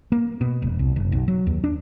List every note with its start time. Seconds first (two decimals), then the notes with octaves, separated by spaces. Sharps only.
0.12 A#3
0.41 B2
0.62 E1
0.79 C2
0.96 F#1
1.12 B1
1.28 F#3
1.47 D#2
1.64 D4